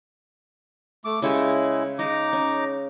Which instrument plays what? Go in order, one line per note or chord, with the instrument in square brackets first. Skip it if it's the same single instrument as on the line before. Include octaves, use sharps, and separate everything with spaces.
[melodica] A3 D6
[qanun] C#3 G4 A4 [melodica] G#3 E4
[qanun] G#3 [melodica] D#4 A#5 D6
[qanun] C#4